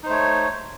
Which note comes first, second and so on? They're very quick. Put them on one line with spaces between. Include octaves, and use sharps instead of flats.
D#4 C5 A3 C#5